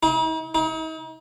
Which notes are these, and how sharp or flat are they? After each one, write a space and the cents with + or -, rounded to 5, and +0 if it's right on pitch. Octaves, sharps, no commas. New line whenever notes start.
D#4 +45
D#4 +40